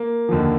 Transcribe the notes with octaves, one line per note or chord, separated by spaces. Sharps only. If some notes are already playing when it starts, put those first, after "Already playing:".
Already playing: A#3
D#2 D3 F3